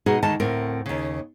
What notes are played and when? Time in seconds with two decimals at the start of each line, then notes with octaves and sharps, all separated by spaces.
0.06 B2 G#3 D#4 F#4 G#4
0.23 D2 D#3 G#3 D#4 A5
0.40 D2 A2 C4 A#4
0.86 D#2 C#3